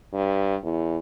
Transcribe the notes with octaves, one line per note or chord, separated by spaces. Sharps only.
G2
E2